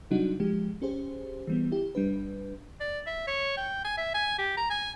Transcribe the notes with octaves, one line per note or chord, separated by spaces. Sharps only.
C3 F#3 G3 D4 D#4 F#4
F3 G#3 G4
C#4 G4 G#4 C5
E3 G3 B3
E4 G4
G1 G3 D4 B4
D5
E5
C#5
G5
G#5
E5
G#5
G4
A#5
G#5